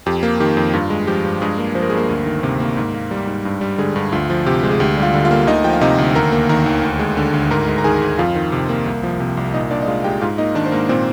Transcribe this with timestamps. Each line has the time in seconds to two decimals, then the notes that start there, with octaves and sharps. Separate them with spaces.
0.06 F2 G4
0.23 A#3
0.40 D#3 G4
0.57 F2
0.73 G2 F4
0.90 G#3
1.07 F3 G4
1.25 G2
1.41 G2 G#3 G#4
1.58 A#3
1.75 F3 C5
1.82 A#4
1.90 G#4
1.92 G2
1.97 A#3 A#4
2.09 D2
2.26 D#3
2.43 C3
2.60 A#3
2.77 G#2
2.94 A#3
3.11 G3
3.27 G#2
3.45 G2
3.61 G3
3.78 D3 G#3 G#4
3.96 G2
4.12 D2 F4
4.30 F3
4.46 C3 G4
4.63 G#3
4.71 G#4
4.80 D2 G4
4.97 G3
5.02 F4 F5
5.14 D3
5.25 F4 F5
5.31 A#3
5.47 D2 D#4 D#5
5.64 F3 G5
5.73 F5
5.81 C3 D#4 D#5
5.98 D2
6.15 D#2 A#4 A#5
6.32 A#3
6.49 D#3 A#4 A#5
6.66 D#2
6.83 D2
6.99 G#3
7.17 D3
7.34 D2
7.51 G#2 A#4 A#5
7.68 G#3
7.78 A#5
7.84 D#3 G#4 G#5
8.02 G#2
8.18 F2 F4 F5
8.35 D#3
8.52 C3
8.69 A#3
8.86 C2
9.03 F3
9.20 C3
9.37 C2
9.54 A#2 D#4 D#5
9.71 A#2 D4 D5
9.82 D#5
9.87 G#3 F4 F5
10.04 G#3 G4 G5
10.21 G#2 F4 F5
10.38 A#3 D#4 D#5
10.55 D#3 D4 D5
10.66 C5
10.72 G#2 A#3 A#4
10.89 A#2 C4 C5